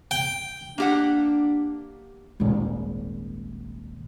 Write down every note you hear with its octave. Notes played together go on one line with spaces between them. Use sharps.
G5
A#3 D4 G4 F#5
D#1 G#1